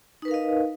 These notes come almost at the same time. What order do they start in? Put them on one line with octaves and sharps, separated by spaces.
D#4 B4 A#4 F5 D#5